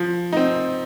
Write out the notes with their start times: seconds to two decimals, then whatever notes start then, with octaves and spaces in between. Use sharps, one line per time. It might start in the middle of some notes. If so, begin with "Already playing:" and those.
Already playing: F3
0.33 C4 D#4